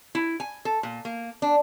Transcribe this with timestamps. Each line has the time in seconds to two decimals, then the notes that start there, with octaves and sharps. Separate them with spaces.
0.15 E4
0.40 G#5
0.65 A4
0.83 A#2
1.05 A#3
1.42 D4